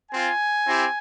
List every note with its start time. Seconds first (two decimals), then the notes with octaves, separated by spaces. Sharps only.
0.10 C4 F4 G#5
0.66 C4 E4 G4